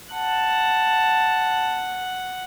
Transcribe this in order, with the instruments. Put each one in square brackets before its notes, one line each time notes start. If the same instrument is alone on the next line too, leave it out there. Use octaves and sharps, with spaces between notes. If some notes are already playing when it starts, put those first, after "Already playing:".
[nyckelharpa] F#5 [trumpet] A5